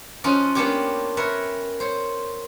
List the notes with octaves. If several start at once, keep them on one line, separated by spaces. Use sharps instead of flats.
F3 C#4 D#4 F4 F#4
A#3 B3 C#4 D4 G4 C#5
A#4 B4 C#5 E5
C5 C#5